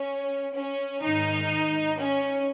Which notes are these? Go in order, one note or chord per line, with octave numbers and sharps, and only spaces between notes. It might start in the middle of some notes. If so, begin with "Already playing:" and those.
Already playing: C#4
C#4
G#2 D#3 D#4
C#4